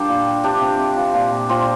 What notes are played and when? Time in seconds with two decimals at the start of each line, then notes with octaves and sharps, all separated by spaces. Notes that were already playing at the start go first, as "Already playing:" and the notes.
Already playing: G3 D4 F4 G4 A#4
0.08 A#2
0.26 G3
0.43 C3 D4 G4
0.61 C3
0.79 C3
0.97 F3
1.14 A#2
1.32 A#2
1.49 A#2 C4 F4